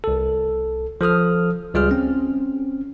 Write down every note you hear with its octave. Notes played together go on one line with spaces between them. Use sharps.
C2 A4
F3 A4 D#6 F6
C#2 G3 F4 G#4 F6
C4 C#4